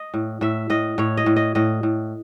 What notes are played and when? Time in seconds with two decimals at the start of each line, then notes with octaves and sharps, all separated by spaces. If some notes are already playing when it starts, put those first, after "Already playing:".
Already playing: D#5
0.14 A2
0.41 A2 E5
0.70 A2 D#5
0.98 A2 C#5
1.17 D#5
1.26 A2
1.36 D#5
1.55 A2 D#5
1.83 A2